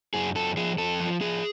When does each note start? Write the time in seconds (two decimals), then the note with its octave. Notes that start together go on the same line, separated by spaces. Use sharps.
0.14 F#2 G#4
0.35 F#2 A4
0.57 F3 G#4
0.78 F2 A4
1.00 F3
1.21 F3 G#4